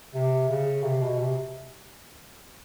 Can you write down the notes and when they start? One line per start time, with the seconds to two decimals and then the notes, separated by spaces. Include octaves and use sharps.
0.14 C3
0.49 C#3
0.83 C3
1.01 B2
1.19 C3